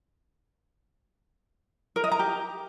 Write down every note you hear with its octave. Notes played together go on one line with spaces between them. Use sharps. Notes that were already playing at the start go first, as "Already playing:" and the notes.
A#4
D#5
A#5
G4